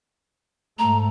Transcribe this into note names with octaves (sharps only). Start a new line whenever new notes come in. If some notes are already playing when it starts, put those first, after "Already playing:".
G#2 A3 A#5